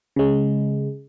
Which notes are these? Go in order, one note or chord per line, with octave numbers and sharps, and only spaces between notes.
C#3 G#3